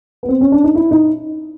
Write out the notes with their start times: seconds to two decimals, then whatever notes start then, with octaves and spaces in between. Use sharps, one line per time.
0.23 B3
0.28 C4
0.41 C#4
0.52 D4
0.64 D#4
0.75 E4
0.91 D#4